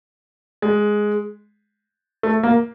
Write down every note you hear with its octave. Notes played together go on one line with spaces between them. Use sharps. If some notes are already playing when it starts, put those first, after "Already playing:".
G#3
A3
A#3